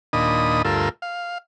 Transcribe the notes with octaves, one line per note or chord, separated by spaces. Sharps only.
D#2 A#2 D4 D#5 B5 D#6
D2 G2 F4 A4 A#4 E6
F5